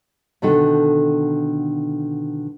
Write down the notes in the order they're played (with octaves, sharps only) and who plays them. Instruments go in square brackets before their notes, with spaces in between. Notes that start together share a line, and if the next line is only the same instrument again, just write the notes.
[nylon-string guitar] B2 D3 D#3 F#4 A4